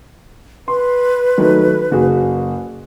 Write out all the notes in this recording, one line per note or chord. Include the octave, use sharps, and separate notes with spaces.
B4 C6
D#3 F#3 A3
F#1 F#4 G#4